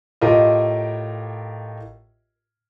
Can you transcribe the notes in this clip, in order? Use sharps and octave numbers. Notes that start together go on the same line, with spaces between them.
A2 F4 G4 A#4 D#5